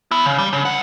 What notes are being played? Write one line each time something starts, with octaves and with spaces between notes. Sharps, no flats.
B3 E4
C#3
G3
C#3
C2 F#5